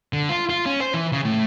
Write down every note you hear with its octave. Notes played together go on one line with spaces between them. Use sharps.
D3
F4
F4
C#4
C5
E3
C#3
A2